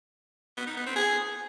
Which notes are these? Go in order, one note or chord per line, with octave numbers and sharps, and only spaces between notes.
B3
D#4
B3
C4
G#4